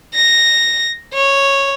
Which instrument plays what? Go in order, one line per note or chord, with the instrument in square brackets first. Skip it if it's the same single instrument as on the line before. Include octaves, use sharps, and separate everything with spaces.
[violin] A#6
C#5